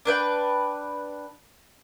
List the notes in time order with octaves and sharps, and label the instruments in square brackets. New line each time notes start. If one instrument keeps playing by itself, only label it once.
[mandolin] D4 B4 G5